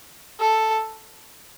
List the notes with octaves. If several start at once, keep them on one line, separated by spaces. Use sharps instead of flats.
A4